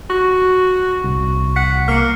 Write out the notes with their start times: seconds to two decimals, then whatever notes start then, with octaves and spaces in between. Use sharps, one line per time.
0.10 F#4 C#6
1.04 C2
1.56 F#5 B6
1.88 A#3 F6 C#7